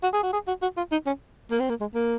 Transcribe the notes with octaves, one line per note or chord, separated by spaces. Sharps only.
F#4
G#4
F#4
G#4
F#4
F#4
F4
D#4
C#4
A#3
C4
A#3
G#3
A#3